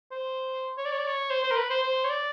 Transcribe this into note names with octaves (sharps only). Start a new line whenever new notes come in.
C5
C#5
D5
C#5
D5
C#5
C5
C5
A#4
B4
C5
C5
C#5
D5